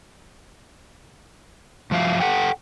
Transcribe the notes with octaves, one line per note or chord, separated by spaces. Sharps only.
G2 F3 F#3 E5 F5
A4 F#5 G5